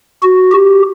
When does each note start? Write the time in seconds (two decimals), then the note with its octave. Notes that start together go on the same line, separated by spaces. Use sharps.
0.23 F#4
0.52 G4